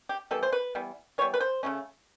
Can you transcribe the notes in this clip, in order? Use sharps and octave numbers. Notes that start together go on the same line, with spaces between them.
G4
E3 G3 B3 A4
C5
B4
E3 G3 B3
E3 G3 B3 C#5
B4
C5
C#3 F#3 A3 C#4